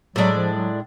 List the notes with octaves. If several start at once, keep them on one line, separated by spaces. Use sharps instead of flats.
A2 F#3 G#3 D4
F3
F#3